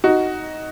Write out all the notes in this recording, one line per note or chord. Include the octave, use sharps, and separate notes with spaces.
D#4 F#4